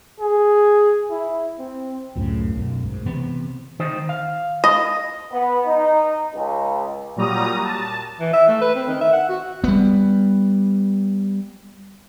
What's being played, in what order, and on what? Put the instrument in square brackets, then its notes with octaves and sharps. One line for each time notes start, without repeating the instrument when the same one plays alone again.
[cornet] G#4
E4
C4
[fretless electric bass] C#2 F#2 A2 C#3
B1 F#2
G#2
C3 E3 B3
[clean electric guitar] D#3 D#4 C5
F5
[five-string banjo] D#5
[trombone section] B3
D#4
C#2
[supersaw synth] A#2 F#3 G3 A#5 D#6
A5
[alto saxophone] E3
E5
A3
B4
C4
D#3
E5
F#5
F#4
[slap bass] G3 B3